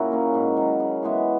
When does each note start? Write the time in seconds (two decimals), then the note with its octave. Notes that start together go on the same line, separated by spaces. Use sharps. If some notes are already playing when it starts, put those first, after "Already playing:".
Already playing: A#2 C#3 E4 F#4 G#4 A#4
0.12 A#3 C#4
0.34 G#2
0.57 D#3 F#3
0.80 C#3
1.02 E3 G#3 B3